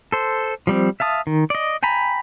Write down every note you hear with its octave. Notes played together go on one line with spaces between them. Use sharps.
A4 C5
F3 G3 C4
E5 F5 A5 D#6
D#3
D5 D#5
G5 G#5 A#5 B5